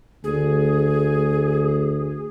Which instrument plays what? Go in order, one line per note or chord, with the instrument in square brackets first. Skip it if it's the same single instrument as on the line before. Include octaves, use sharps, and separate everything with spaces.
[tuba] D2 [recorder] G#4